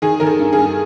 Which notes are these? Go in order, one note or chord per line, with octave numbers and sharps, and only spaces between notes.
D#3 G#4
D#3 A#4
A4
G2
G#4
G2